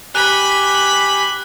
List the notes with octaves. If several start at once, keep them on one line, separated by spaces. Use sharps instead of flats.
G4 G#5 B5 F#6